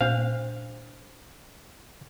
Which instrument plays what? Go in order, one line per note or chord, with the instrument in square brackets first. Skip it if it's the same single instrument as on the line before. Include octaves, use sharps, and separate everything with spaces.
[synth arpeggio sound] A#2 [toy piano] D4 C5 [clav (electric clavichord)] F5